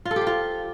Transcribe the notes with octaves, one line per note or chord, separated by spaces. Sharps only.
F4
A4
G4
C5
F4